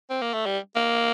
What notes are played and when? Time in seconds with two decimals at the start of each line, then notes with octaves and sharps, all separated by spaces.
0.10 C4
0.22 A#3
0.34 A3
0.46 G3
0.76 A#3